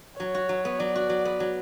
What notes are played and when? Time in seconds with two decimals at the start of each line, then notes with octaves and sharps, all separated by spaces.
0.19 F#3 C#5
0.35 F#4
0.49 F#3
0.65 B3
0.79 F#3 D5
0.95 F#4
1.10 F#3
1.25 B3
1.40 F#3